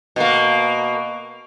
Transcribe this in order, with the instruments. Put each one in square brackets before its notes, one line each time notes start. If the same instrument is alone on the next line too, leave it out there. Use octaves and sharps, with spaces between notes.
[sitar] B2 A#3